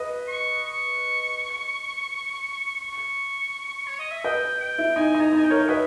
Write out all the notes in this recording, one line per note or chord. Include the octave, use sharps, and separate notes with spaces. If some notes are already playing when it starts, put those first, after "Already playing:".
Already playing: B4 D#5
C#6
C#6
C#6
C#5
D#5
E5
B4 D#5 G5
G5
E4
D#4 G#5
D#4
A#5
D#4
G#5
G5
A#4 C#5
B4 D#5 E5